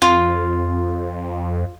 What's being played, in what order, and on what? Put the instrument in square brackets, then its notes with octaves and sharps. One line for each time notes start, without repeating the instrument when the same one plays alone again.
[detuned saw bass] F2 [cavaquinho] F4